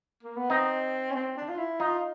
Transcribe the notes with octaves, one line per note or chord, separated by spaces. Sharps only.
A#3
B3
C4 D#4
C#4
C4
D4
F4
E4
D#4 F4